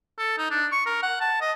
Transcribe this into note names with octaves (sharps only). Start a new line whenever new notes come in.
A4
D#4
D4
C#6
A#4
F#5
A5
D#5